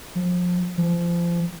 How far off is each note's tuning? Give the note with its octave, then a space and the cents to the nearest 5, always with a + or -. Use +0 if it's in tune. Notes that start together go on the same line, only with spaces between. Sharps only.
F3 +30
F3 -25